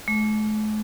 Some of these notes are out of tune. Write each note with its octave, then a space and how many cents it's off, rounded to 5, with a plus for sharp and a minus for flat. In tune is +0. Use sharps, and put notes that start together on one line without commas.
A3 -45